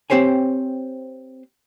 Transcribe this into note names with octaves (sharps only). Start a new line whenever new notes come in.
C4 G4 C5 C#5 G#5